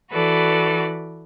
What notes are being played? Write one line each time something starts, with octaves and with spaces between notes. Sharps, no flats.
E3 F#4 A4 B4 D5